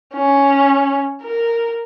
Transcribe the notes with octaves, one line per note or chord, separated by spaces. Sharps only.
C#4
A#4